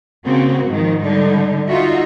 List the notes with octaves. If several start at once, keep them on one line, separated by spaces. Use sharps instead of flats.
C#3 A#3 C4 F#4
G#2 D#3 F3
D3 G3 D#4
D#4 F4 F#4 E5